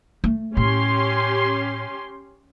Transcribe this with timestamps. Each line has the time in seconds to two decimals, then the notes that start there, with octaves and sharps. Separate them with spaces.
0.24 A3
0.57 A2 C#4 G4 C6